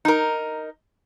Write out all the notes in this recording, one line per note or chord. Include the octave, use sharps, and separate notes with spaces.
D#4 A#4